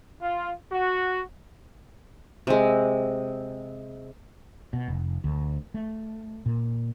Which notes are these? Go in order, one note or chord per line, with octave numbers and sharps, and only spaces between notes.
F4
F#4
C3 G#3
B2
F1
D2
A3
A#2